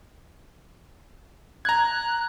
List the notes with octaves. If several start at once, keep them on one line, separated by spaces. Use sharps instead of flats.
A#5 F#6 G#6